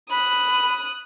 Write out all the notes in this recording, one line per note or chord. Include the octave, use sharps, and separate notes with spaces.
B5 D#6 F#6